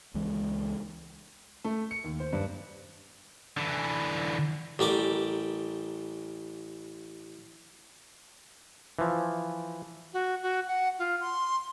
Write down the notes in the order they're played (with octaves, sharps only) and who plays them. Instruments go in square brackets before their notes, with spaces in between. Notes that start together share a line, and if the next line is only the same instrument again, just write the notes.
[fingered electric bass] C#2 E3 G#3
[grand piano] A3
C#7
D#2
C5
G2
[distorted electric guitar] D3 E3
[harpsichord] A1 G3 A#4 D6
[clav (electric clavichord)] E3 F3
[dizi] F#4
F#4
F#5
F4
C6